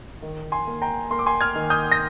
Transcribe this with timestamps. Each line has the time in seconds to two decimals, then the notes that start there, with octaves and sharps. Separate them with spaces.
0.22 D#3
0.52 G#5 C6
0.67 A#3
0.82 G5 A#5
1.11 A#3 C6
1.19 D6
1.26 G#5 C6
1.40 F6 G#6
1.56 D#3
1.70 D#6 G6
1.92 A#6